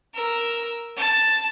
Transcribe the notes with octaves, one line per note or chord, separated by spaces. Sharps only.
A#4 E6
A5